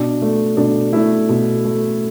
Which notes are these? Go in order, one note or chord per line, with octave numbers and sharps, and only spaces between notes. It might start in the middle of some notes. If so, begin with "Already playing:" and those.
Already playing: B2 D4
A3
B2 D4
A3 E4
B2
A3